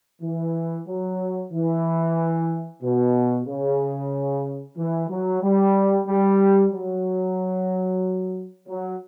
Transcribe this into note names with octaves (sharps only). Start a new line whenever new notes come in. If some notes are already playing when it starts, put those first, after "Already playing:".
E3
F#3
E3
B2
C#3
E3
F#3
G3
G3
F#3
F#3